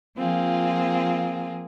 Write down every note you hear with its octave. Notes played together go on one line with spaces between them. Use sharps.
F3 A#3 C4 F4 G#4